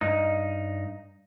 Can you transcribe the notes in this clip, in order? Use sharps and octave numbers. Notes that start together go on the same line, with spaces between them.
G2 D#4